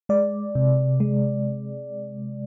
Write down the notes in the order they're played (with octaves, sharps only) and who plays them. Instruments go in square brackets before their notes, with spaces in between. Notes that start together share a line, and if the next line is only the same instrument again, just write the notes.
[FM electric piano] G#3 D5
C3
G#3